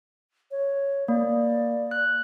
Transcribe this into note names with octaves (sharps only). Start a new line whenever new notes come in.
C#5
A#3 D5
F#6